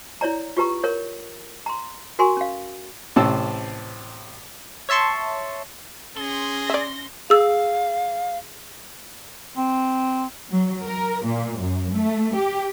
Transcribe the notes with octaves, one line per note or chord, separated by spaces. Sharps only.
E4 C#5 D5 A#5
F4 G4 B4 A#5 C#6
A#4 C#5
A#5 C6
F#4 A#4 G#5 C6 C#6
C#4 F5
A1 C3 C4 C#4 A5 E6
C#5 E5 A5 C6 C#6
C#4 G#4 C6 A#6
D5 E5
G#4 F5 E6
C4
F#3
A#4
A#2
F#2
A3
G4